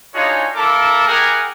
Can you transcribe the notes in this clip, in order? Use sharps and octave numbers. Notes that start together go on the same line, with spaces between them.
D4 D#4 F4 F#4 G#4 C#5
A#3 E4 A4 A#4 A5 D6
E4 G4 G#4 A#4 F#5 G#5